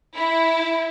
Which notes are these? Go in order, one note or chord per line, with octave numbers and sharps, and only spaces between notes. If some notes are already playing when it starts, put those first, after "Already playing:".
E4